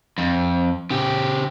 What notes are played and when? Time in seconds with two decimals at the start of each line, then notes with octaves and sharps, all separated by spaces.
0.18 F2
0.90 C#3 G4